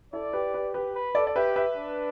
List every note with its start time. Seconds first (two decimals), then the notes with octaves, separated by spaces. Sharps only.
0.13 E4 A4 D5
0.33 G4 B4
0.54 G4 B4
0.74 G4 B4
0.95 B4
1.15 A4 D5
1.27 D5
1.36 G4 B4 E5
1.56 B4 E5
1.76 D4